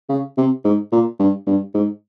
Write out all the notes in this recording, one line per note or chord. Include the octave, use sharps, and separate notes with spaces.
C#3
C3
G#2
A#2
G2
G2
G#2